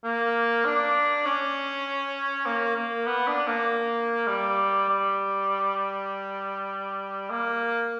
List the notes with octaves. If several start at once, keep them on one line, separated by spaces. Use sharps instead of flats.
A#3
D4
C#4
A#3
A#3
B3
D4
A#3
G3
G3
A#3